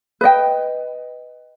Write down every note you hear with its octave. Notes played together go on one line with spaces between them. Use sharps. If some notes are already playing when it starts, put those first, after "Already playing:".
B4 D#5 G5